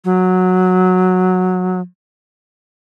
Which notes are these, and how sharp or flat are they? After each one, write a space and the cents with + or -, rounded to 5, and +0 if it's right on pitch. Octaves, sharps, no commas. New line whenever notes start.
F#3 -10